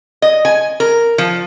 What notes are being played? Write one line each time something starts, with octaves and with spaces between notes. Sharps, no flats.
D#5
G#5
A#4
F3